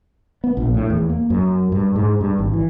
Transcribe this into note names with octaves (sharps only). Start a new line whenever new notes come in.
B3
A#1
A2
E2
A#3
F#2
G2
G#2
G2
G#1
E3